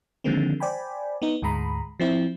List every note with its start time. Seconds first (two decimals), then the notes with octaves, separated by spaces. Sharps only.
0.24 D3 D#3 F3 G#3 A#3 C4
0.60 C5 D5 G5 G#5 B5
1.22 B3 D#4
1.42 D2 G#2 G#3 A#5 B5
2.00 F3 C4 E4